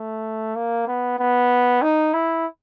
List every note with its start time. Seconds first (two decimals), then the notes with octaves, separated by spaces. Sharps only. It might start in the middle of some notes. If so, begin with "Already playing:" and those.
Already playing: A3
0.56 A#3
0.87 B3
1.19 B3
1.82 D#4
2.13 E4